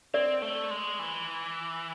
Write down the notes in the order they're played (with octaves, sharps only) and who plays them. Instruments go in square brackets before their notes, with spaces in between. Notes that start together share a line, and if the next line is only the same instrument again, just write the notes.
[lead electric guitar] C4 [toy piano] D5
[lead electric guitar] A3
G#3
E3